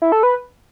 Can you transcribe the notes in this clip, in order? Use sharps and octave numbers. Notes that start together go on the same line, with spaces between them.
E4
A4
B4